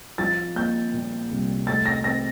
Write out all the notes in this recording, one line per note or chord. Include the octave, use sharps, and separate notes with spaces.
F3 A6
A#3 G6
A#2
C2
A3 A6
A#6
C4 A#6